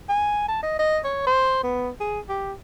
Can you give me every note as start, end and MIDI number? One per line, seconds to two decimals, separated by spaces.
0.09 0.44 80
0.48 0.61 81
0.63 0.76 75
0.79 0.99 75
1.04 1.23 73
1.27 1.61 72
1.63 1.90 59
2.00 2.20 68
2.29 2.53 67